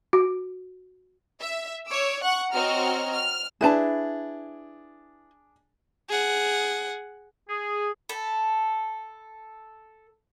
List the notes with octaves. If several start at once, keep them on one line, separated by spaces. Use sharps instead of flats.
F#4
E5
C#5 D6 E6
F#5 C#6 F#6
C4 F#4 C#5 D#5 A#5 F6
F6
D4 E4 G#4 B4 A5
G#4 F#5
G#4
A4 B5